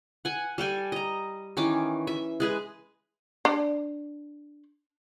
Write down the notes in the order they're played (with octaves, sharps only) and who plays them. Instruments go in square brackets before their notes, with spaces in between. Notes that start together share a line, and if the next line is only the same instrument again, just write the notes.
[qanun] F#5 G#5
G3 A4 G5 G#5
D#5 A#5
D#3 E3 C#4 D6
E5
G#3 G#4 B4
[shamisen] D4 D5